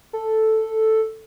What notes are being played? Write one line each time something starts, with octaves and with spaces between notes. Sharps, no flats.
A4